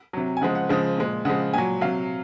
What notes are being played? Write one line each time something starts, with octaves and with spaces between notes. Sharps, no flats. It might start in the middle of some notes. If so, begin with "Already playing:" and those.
C3 F#3
G#5
C#3 F3 G#3 F#5
F#5
C#3 F3 G#3
A#2 G#3
C#3 F3 G#3 F#5
A#2 F#3 G#5
C3 F#3 F5